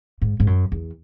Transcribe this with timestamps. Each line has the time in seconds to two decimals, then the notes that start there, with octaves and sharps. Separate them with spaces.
0.22 G#2
0.40 G#2
0.47 F#2
0.72 E2